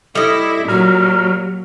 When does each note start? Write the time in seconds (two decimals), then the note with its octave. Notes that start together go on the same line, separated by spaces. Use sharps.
0.15 G3 E4 A4 D#5
0.68 A#2 F#3 F#4 A#5 F6